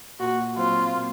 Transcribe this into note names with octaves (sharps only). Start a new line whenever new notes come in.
A#2 F#4
F#3 C4 F4
A#2